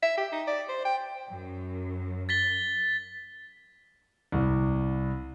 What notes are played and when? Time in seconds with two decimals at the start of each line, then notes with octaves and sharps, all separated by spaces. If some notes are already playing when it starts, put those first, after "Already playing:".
0.02 E5
0.17 G4
0.32 D#4
0.47 D5
0.69 C5
0.85 G5
1.29 F#2
2.29 A6 B6 G7
4.32 C2